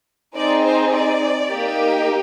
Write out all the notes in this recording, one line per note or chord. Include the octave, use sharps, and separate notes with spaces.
C4 D#4 G#4 D5
C5
D5
A#3 D#4 G4